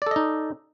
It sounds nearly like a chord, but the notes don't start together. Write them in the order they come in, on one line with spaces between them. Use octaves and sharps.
D5 A4 D#5 D#4